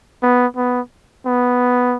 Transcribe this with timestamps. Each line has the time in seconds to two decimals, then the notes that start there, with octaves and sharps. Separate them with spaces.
0.22 B3
0.56 B3
1.26 B3